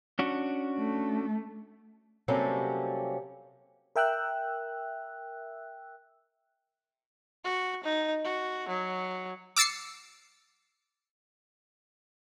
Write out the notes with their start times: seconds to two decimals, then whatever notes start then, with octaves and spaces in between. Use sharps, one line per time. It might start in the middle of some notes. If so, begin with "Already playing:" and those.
0.19 C#4 D4 F#4
0.79 A3
2.28 C3 F#3 G3 A#3 C#4 A4
3.96 A#4 E5 G5 E6 F#6
7.44 F#4
7.83 D#4
8.24 F#4
8.68 F#3
9.57 D6 E6 A6 C7 C#7